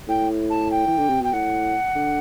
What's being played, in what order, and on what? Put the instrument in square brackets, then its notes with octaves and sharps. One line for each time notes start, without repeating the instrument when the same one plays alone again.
[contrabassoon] A2 [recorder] G5
[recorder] A5
G5
[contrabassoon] E3
D3
C3
[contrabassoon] B2 [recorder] G5
[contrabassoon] A2 [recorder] F#5
[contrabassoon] D3